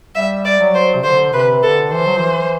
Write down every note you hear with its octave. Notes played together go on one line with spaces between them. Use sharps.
G3 E5
D5
F#3
C5
C3
D3 C5
C3 B4
D3 A4
E3 C5
F#3
E3